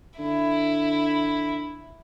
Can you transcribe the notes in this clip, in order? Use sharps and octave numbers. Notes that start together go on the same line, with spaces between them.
D3 E4